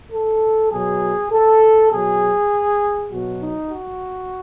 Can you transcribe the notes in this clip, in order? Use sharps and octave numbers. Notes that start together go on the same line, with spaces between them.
A4
B2 F#3 G#4
A4
B2 F#3 G#4
B2 F#3 F#4
D#4
F#4